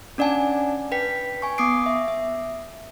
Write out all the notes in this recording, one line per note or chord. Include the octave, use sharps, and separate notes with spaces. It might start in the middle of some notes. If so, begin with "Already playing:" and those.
C#4 D4 D5 F#5 G#5 A5
B4 G5 B6
G#5 C#6
B3 D6 D#6 C7 D7
E5
E5